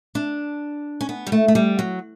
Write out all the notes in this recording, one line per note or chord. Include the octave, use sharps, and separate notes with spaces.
D4
C#4
B3
G3
A3
A3
G3
F#3